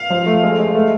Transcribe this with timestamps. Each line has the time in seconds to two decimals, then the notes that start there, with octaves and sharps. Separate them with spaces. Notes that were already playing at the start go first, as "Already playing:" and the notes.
Already playing: F5
0.10 F3
0.26 A3
0.43 G#3
0.59 G#3
0.74 A3